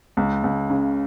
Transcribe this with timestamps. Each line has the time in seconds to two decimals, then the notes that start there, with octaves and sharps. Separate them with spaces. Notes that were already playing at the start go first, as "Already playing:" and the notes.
0.17 C#2
0.44 C#2
0.70 C#3